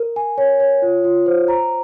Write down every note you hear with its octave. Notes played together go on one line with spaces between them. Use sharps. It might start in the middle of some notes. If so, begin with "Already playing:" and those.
Already playing: A#4
G#5
C#5
C#5
F4
F4
C5
A#5